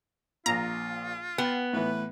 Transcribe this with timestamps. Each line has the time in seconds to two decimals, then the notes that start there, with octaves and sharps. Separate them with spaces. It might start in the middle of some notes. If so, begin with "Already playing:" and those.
0.46 A#1 A#2 F4 A#5
1.38 B3 G5
1.73 A2 E3 B4